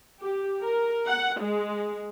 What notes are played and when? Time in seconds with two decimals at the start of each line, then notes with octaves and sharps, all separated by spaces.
0.21 G4
0.63 A#4
1.08 F#5
1.41 G#3